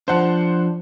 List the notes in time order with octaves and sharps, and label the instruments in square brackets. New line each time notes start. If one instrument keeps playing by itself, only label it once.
[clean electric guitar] F3 D4 [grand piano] C5 F#5 A5